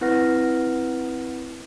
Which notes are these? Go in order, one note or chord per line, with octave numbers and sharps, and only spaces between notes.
C4 E4 B4 F#5 F6 A#6